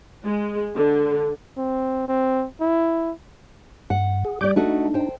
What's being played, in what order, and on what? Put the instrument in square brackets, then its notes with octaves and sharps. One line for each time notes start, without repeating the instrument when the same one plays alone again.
[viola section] G#3
D3
[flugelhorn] C4
C4
E4
[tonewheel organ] G2 [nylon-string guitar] F#5
[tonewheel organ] G#4
[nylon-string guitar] G3 D5 [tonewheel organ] D6 G6
[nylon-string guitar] A3 F#4 D#5 [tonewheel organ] D4 D#4
[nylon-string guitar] C5 G5